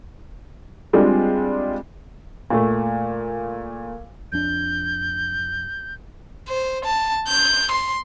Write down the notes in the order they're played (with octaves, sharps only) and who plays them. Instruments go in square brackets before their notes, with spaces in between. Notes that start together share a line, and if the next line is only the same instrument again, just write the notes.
[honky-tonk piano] G3 G#3 C4 D4 F4
[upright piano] A#2 A3
[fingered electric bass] F1 F2 D4 [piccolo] G6
[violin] C5
A5
G6
C6